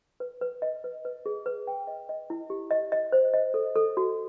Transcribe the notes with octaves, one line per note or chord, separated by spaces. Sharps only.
B4
B4
D#5
B4
B4
G#4
B4
G5
D#5
D#5
E4
G4
D#5
D#5
C5
D#5
A4
A4
F#4